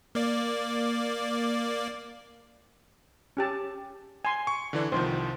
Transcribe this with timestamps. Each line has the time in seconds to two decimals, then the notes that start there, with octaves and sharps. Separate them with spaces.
0.15 A#3 D5
3.37 C#4 G4 A5
4.25 G#5 C6
4.47 C#6
4.73 D3 E3 D4
4.92 C2 D#3 F3 C5